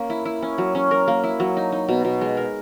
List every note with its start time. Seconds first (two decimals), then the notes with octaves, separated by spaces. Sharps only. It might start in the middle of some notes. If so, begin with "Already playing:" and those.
Already playing: A#3 C#4
0.10 E4
0.25 E4
0.42 C#4
0.58 F#3
0.75 C#4
0.91 A#4
1.08 A#3
1.24 E4
1.40 F#3
1.57 D#4
1.72 D#4
1.89 B2
2.05 B2
2.21 G#3
2.37 A#4